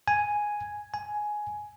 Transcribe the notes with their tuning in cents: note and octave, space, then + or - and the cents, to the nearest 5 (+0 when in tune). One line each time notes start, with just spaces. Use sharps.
G#5 +0
G#5 +10